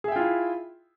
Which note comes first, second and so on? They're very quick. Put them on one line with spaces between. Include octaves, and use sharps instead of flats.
G#4 E5 G5 F4 E4